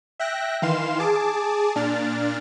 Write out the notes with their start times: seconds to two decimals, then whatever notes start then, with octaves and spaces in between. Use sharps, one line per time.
0.19 E5 G5 F#6 A#6
0.62 D#3 E3 F5 C6 E7
0.99 G#4 A5 D6
1.75 A#2 D4 F6 A6